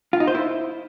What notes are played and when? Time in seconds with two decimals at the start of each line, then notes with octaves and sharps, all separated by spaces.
0.13 F4
0.20 D#4
0.27 C5
0.35 E4